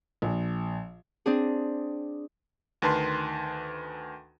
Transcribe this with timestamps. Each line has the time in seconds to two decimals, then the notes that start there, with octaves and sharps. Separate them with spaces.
0.22 A#1
1.26 C4 D4 G#4
2.82 D2 D#3 B4 A5 C6